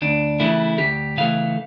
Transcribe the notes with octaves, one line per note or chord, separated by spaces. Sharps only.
D2 D4
C#3 E3 A3 E4
D2 G4
C#3 E3 A3 F5